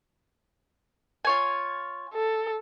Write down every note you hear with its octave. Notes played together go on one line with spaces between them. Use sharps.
F4 C#5 G#5
A4